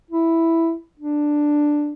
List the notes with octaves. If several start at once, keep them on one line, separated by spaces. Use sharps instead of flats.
E4
D4